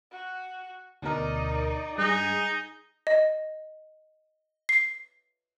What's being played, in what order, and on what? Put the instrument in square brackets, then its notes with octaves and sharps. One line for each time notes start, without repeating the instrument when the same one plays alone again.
[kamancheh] F#4
[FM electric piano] D2 B2 A#4 [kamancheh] D#4 D5
[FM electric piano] G2 G3 G#3 [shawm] D#4 [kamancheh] G#4 G#5
[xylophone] D#5
C7